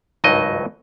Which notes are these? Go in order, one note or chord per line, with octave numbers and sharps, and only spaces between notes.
G#1 C#2 G2 F#3 D#4 D#5